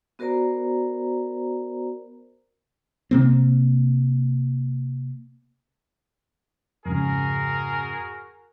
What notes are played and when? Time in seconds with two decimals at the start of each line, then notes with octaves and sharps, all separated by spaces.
0.19 B3 F#4 A#4 C5 D5 A#5
3.11 C3 A#3 C4
6.86 F2 G#2 C#3 F#4 G#4 A#4